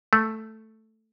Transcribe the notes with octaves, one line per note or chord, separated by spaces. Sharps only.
A3